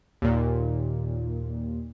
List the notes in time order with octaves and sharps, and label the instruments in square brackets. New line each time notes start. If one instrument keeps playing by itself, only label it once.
[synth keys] D#2 A#2